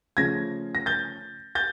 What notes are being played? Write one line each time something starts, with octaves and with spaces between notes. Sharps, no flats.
C#3 F3 A3 C#4 G#6 A#6
A#6
G6 A6
G6 A6